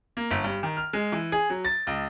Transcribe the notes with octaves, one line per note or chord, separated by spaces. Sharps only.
A#3
G1
G2
D#3
F6
G#3
E3
G#4
F#3
A6
C#2